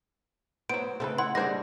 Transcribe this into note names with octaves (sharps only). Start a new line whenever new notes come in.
F#3 B3 C5 D7
C#3 A3 C4 A4 B4
E4 F#5 C6
G3 G#3 A#3 D4 G#4 C5 A#6